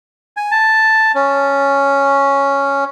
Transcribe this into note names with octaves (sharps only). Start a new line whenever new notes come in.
G#5
A5
C#4